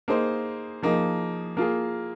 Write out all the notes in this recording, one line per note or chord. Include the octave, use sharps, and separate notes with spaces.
A#3 D#4 G#4 C5
F3 A#3 D#4 G#4
A#3 F4 G#4